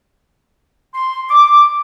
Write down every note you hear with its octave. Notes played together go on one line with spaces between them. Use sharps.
C6
D6